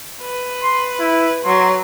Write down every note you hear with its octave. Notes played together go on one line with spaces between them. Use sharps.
B4
C6
E4
F#3 C6